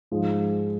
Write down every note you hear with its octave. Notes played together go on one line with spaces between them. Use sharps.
G#2 F3 G#3